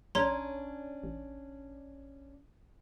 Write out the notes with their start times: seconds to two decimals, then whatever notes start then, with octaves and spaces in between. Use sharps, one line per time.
0.15 A#1 C#4 D4 C#5 A#5 C6
1.03 A1